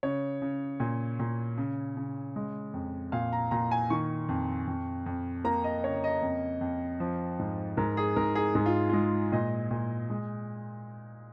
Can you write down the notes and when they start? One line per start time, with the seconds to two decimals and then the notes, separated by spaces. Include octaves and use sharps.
0.03 C#3 C#5
0.42 C#3
0.80 A#2
1.20 A#2
1.58 C#3
1.97 C#3
2.36 G#3
2.74 F2
3.12 A#2 F5
3.33 A#5
3.51 A#2 A#5
3.71 G#5
3.90 D#3 C#6
4.29 F2
4.67 F2
5.06 F2
5.45 A#3 A#5
5.64 D#5
5.84 C#3 C#5
6.04 D#5
6.22 F2
6.61 F2
7.00 F3
7.39 G#2
7.77 G#2 A#4
7.97 G#4
8.16 G#2 A#4
8.35 G#4
8.55 G#2 G#4
8.66 F4
8.89 G#3 F4
9.32 A#2 D#5
9.71 A#2
10.10 G#3